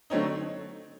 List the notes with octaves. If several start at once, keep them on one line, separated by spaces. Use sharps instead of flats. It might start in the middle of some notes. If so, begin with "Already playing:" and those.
D3 F#3 A3 C4 D#4 C#5